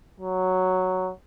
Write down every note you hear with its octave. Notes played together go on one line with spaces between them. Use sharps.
F#3